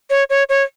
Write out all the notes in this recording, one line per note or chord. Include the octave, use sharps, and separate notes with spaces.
C#5
C#5
C#5